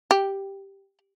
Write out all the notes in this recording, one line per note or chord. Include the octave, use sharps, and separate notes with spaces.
G4